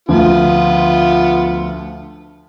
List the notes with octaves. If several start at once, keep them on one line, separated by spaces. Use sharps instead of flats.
D2 F3 B3 F4